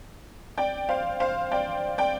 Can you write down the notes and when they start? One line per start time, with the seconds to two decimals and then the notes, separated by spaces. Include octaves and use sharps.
0.58 D5 G5
0.89 C5 F5
1.20 C5 F5
1.52 D5 G5
1.98 D5 G5